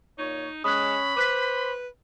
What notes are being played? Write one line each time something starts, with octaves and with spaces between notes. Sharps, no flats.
A#2 D#4 C#5
G#3 C#4 B5 D#6 F#6
B4 C5 D6 F#6 B6